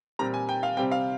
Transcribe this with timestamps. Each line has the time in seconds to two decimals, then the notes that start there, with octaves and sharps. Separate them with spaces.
0.19 A#2 G3 C4 A#5
0.34 G#5
0.49 G5
0.63 F5
0.77 C3 G3 C4 G5
0.91 F5